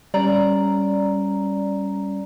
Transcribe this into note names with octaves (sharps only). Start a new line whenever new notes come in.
G3 C#4 D5 A#5